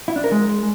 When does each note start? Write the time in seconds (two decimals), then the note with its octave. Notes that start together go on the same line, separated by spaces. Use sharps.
0.08 E4
0.16 D4
0.24 A#4
0.32 G#3